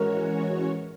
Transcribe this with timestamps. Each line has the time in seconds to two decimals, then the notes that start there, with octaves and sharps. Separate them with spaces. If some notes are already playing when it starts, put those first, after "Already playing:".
Already playing: E3 G#3 C#4 F#4 A#4 C#5